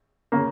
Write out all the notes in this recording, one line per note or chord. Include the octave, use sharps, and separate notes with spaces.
C#3 A#3